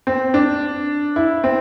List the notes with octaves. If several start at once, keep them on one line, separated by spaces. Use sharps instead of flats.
C4
D4
E4
C4